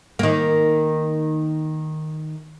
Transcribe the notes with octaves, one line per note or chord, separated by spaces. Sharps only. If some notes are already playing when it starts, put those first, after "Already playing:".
D#3 A#3